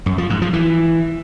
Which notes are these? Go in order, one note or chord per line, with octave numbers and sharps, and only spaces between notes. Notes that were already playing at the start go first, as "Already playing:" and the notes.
F#2
F3
G#2
F3
E3